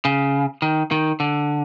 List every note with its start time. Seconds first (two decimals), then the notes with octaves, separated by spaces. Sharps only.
0.05 C#3
0.62 D#3
0.91 D#3
1.20 D3